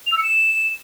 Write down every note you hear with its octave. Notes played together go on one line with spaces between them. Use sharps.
F7
E6
C#7
E7